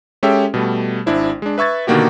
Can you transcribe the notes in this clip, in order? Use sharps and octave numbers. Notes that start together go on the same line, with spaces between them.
G#3 C#4 G4 A4 E5 G5
B2 G3 A3
G#1 D4 E4 C5
G#3 D4
B4 E5 C#6 G#6 A6
B2 D3 D#3 A#3 F#4 G4